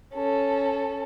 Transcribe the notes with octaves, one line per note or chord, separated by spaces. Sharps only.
C#4 A4